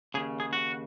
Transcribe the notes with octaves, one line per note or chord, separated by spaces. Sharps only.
D#2 C#3 G#4
G#4
F#4